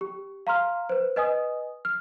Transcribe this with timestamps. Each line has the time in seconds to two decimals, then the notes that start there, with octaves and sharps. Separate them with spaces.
0.01 G4
0.47 F5 A#5 C6 F6
0.89 B4 C5
1.16 B4 D#5 G#5 D#6
1.85 F6